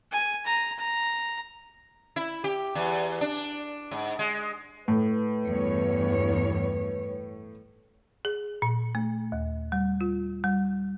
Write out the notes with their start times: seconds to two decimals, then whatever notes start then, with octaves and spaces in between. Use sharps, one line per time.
0.11 G#5
0.46 A#5
0.79 A#5
2.16 E4
2.44 G4
2.75 E2
3.21 D4
3.91 G#2
4.19 G#3
4.88 A2 B4
5.46 E2 G2 C#5
8.25 G#4
8.62 A#2
8.95 A3
9.32 D#2
9.72 G3
10.01 F4
10.44 G3